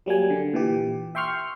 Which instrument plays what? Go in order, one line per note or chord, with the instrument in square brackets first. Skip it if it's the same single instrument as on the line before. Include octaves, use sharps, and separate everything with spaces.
[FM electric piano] F#3 G3 A#3 G#5
D3
A#2 E3 G4
E5 G5 C6 C#6 F6